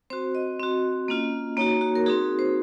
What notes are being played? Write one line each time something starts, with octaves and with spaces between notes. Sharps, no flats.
C4 F#4 C5
D#5
C4 F#4
A#3 C#4 F4
A#3 D#4 F#4 C#5
F#4
A#4
C4 D#4 F#4 G#4
C5